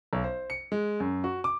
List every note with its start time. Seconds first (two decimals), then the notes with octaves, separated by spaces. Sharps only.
0.13 B1
0.24 C5
0.50 C#7
0.72 G#3
1.00 F#2
1.24 F#4
1.44 D6